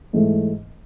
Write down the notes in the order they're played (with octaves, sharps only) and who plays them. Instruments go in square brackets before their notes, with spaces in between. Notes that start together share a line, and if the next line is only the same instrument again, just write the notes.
[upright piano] G#2 E3 A3